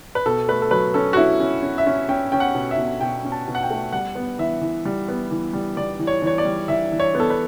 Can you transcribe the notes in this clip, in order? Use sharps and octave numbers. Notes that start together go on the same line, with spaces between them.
B4
B2 A4
A3 B4
A4
F#3 B4
C#4 A4
F#4
C#4 E4
C#4
C#4
E5
C#4
C#4 G5
C#4 G5
F#5
B2
E5
B2
B2 G5
C#4
A5
B2
F#5
G5
A3
G3 F#5
B3
E3 E5
E3
G3
B3
E3
G3
G3 D5
E3
C#5
E3 C#5
D5
G3
E3 E5
E3
C#5
B3
A4
B4